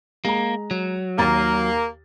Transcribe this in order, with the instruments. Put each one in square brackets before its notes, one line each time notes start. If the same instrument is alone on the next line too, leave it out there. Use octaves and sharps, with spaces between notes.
[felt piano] G#3 A#5 [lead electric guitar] A#3
[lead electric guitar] F#3
[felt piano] D#2 A#5 A6 [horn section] A#3